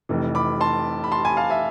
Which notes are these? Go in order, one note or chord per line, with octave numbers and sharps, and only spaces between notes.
F1 F2 C3 E3
B5 D6
A5 C6
B5
A5 C6
G#5 B5
F5 A5
E5 G#5